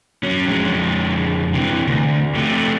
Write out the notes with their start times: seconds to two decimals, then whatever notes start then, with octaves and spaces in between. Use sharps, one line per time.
0.23 F#3 C#4
0.46 F2 G#3
1.54 C3 E3
1.87 D2
2.35 C3 A3